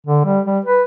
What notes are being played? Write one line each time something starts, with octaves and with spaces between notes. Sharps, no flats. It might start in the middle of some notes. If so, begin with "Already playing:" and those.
D3
G3
G3
B4